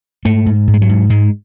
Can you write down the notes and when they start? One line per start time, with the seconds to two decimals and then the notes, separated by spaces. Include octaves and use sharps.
0.25 G#2 A3
0.46 G#2
0.68 G#2
0.74 G#3
0.82 F#3
0.89 G#2
1.10 G#2 G#3